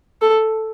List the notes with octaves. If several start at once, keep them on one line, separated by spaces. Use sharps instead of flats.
A4